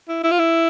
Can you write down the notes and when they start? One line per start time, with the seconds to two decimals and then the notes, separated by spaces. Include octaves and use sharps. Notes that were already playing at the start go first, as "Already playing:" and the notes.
0.09 E4
0.24 E4
0.31 F4
0.39 E4